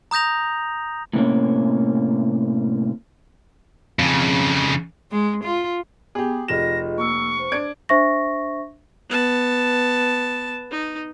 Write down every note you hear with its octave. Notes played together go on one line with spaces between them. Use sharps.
A#5 D#6 G6 A#6 F7
A2 C3 A#3 C#4
F2 C#3
G#3
F4
B3 G4 G#4
F1 F4 G#4 D#5 A#6 E7
A#3 C#6 E6
C5
D4 G#6 D7
D4 C5 E5 C#6 A#6
B3 A5
D#4